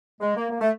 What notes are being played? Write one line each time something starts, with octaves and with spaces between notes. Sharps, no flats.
G#3
A#3
A#3
A3